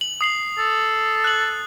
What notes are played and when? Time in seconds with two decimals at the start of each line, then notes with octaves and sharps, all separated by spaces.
0.01 F#7
0.21 D#6 C7 F#7
0.58 A4
1.24 F#6 F#7